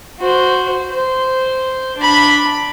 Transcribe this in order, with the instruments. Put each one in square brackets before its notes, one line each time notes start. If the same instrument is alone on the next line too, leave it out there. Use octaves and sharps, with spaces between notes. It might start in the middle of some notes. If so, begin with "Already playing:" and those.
[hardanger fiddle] F#4 C5
C5
D4 B5